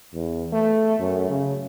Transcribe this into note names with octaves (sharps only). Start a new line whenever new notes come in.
E2
A3
F#2
C#3